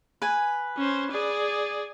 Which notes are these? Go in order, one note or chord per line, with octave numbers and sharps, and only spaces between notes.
B4 G#5
C#4 C5
G#4 D5